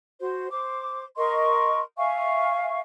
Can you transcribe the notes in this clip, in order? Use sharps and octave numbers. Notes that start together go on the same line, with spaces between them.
F#4 C5
C5 D6
A#4 D#5 C6 C#6
E5 F5 G#5 C#6